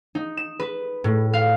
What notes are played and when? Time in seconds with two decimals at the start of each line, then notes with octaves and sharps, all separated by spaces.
0.15 D#4
0.37 E7
0.60 B4
1.04 A2
1.33 F5